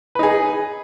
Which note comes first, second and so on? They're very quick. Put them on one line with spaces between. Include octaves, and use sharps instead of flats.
B4 D#4 G#4